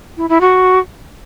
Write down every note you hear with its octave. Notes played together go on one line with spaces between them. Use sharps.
E4
E4
F#4